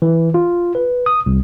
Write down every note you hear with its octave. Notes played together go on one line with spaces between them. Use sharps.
E3
F4
B4
D#6
C2